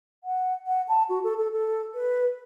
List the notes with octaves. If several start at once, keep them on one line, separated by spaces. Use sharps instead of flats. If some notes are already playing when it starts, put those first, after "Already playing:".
F#5
F#5
A5
F#4
A4
A4
A4
B4